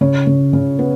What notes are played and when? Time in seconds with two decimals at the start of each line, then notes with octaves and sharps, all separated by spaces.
0.01 C#3 C#5
0.27 C#3
0.53 C#3
0.79 B3